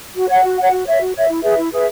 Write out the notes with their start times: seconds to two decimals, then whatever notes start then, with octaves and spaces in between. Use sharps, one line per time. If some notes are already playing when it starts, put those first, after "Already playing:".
0.14 F#4
0.29 C#5 F#5
0.43 F#4
0.57 C#5 F#5
0.71 F#4
0.85 C#5 E5
1.00 F#4
1.14 C#5 E5
1.28 E4
1.42 G#4 B4 E5
1.57 E4
1.71 G#4 B4 E5